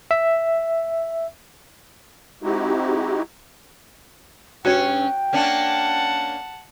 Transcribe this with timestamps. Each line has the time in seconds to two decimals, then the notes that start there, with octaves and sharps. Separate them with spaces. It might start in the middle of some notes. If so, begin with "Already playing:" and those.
0.11 E5
2.43 G#3 C4 D#4 E4 F#4 G4
4.65 G2 C#4 F#4 C#5 G5
5.33 A#3 C#4 D4 F#5 A5